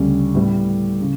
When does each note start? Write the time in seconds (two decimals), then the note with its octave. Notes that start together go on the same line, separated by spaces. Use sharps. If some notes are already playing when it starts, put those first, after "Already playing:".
Already playing: D2 C#3 G3 C#4
0.35 A2 G3 B3
1.01 C#3